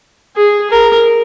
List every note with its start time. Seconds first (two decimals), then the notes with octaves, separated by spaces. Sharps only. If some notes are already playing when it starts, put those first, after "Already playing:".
0.36 G#4
0.71 A#4